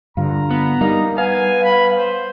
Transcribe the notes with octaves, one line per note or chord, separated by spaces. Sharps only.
G2 D3 F4 A#5
B3
G3 A#3 D#4
B3 F5 G#5
B5
C5